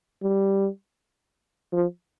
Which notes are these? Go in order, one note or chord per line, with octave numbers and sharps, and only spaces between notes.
G3
F3